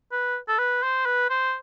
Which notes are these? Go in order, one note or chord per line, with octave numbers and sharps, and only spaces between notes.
B4
A4
B4
C5
B4
C5